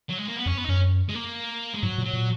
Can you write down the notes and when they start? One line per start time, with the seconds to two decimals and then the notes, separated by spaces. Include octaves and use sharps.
0.10 F#3
0.19 G#3
0.28 A#3
0.37 B3
0.46 F2 C#4
0.58 B3
0.65 D#4
0.68 F#2 C#4
1.09 G#3
1.15 A#3
1.74 G#3
1.83 G#2 F#3
1.98 A#2
2.05 F#3
2.13 A#2